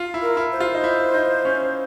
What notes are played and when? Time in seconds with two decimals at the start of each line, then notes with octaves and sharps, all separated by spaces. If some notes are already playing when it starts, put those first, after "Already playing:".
Already playing: F4
0.14 E4
0.22 A#4
0.37 E4
0.52 C5
0.60 F4
0.75 D#4
0.84 E4
1.14 D#4
1.45 C#4